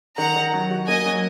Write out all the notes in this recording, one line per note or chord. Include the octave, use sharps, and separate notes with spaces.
D#3 F#5 A#5
D#3
F#3
F#4
A#3 D#5 G#5
F#3